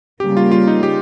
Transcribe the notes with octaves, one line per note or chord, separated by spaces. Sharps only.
C#3 G3 A#3 G4
F4
F4
D#4
G4